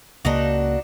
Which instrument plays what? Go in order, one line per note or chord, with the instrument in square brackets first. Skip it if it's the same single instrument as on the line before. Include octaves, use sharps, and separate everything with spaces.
[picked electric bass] C#2 C#3 A#3 [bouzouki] D4 D#4 F#4